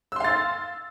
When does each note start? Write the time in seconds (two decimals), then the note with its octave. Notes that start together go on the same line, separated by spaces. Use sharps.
0.12 E6
0.16 C6
0.20 F5
0.25 A6